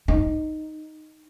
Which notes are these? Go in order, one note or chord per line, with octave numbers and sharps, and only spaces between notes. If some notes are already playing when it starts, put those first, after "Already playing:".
D#4